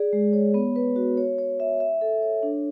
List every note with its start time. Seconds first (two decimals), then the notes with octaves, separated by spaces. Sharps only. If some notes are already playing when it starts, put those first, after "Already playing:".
Already playing: G#4 D5
0.13 G#3
0.33 C#5
0.54 B3
0.76 B4
0.96 F#4
1.17 C#5
1.38 C#5
1.60 E5
1.80 E5
2.01 A4
2.22 C#5
2.43 D4